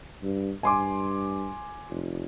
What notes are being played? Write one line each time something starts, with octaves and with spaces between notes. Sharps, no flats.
G2
G2 G#5 C6 D6
F1